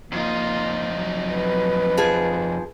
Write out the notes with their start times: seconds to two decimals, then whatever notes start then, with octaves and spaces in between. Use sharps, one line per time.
0.12 F2 A#3 D#4 F4
0.93 F#3
1.34 B4
1.97 F3 G#4